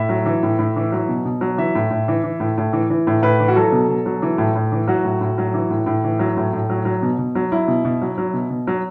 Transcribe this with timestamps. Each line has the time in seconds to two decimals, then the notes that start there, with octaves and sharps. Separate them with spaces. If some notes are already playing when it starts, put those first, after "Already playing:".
Already playing: A2 E5
0.09 F#3
0.26 E3
0.43 A2
0.59 A2
0.76 E3
0.92 F#3
1.09 B2
1.25 B2
1.41 F#3
1.58 E3 E5
1.75 A2
1.90 A2
2.08 E3
2.23 E3
2.40 A2
2.58 A2
2.73 E3
2.90 E3
3.07 A2
3.23 A2 B4
3.40 E3
3.48 F#4
3.56 F#3 A4
3.72 B2
3.89 B2
4.06 F#3
4.22 E3
4.38 A2
4.55 A2
4.72 E3
4.88 F#3 F#4
5.04 A2
5.21 A2
5.38 F#3
5.54 E3
5.70 A2
5.86 A2
6.04 E3
6.19 F#3
6.37 A2
6.53 A2
6.70 F#3
6.85 F#3
7.02 B2
7.18 B2
7.35 F#3
7.52 F#3 E4
7.68 B2
7.85 B2
8.02 F#3
8.18 F#3
8.34 B2
8.50 B2
8.67 F#3